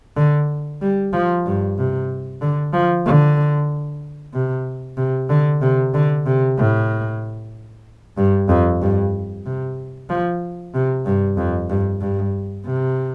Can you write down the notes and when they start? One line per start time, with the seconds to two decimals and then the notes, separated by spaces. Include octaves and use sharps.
0.17 D3
0.81 G3
1.13 F3
1.46 G2
1.78 C3
2.41 D3
2.73 F3
3.05 D3
4.34 C3
4.97 C3
5.29 D3
5.62 C3
5.94 D3
6.26 C3
6.58 A2
8.18 G2
8.49 F2
8.82 G2
9.46 C3
10.10 F3
10.74 C3
11.06 G2
11.37 F2
11.70 G2
12.01 G2
12.65 C3